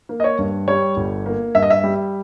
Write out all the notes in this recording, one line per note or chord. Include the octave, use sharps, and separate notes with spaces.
A#3
D#5
C#5
G2
G3 C#5
G1
A#3
G2 E5
D#5
E5
G3